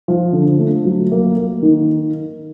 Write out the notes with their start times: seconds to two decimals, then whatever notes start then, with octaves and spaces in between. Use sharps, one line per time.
0.08 F3
0.33 D3
0.59 A3
0.85 F#3
1.12 A#3
1.37 A#3
1.62 D#3